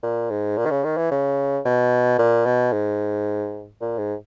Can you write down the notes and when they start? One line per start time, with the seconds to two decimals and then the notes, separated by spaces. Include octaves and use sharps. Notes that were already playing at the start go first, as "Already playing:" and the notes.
0.03 A#2
0.30 G#2
0.57 A#2
0.66 D#3
0.71 C#3
0.84 D#3
0.97 E3
1.11 C#3
1.65 B2
2.18 A#2
2.46 B2
2.72 G#2
3.81 A#2
3.98 G#2